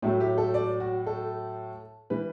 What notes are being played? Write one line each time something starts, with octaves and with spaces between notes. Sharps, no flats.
A2 F#3 A3 E4
G4
A4
D5
F#4
A4
E3 G3 B4